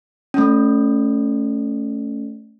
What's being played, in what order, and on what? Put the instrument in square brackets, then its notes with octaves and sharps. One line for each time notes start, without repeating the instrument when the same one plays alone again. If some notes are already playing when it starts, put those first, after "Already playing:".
[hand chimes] A3 C#4